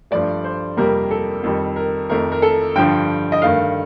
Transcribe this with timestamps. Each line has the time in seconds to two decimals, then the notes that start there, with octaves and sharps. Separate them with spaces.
0.11 G2 F3 A3 D5
0.44 C5
0.77 F2 C3 G3 A#3 A#4
1.11 A4
1.43 F2 D#3 G3
1.76 A#4
2.10 F2 D#3 A3 A#4
2.32 A#4
2.42 A4
2.75 G2 D3 F3 G5
3.32 D#5
3.42 G2 D#3 A3 F5